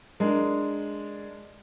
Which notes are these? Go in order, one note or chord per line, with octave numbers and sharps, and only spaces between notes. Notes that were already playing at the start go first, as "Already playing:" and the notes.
G#3 D4 A#4